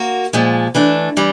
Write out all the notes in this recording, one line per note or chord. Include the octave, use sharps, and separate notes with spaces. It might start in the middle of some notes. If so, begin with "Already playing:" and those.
Already playing: A#3 F#4
A#2 F3 G#3
E3 A3 D4
E3 G3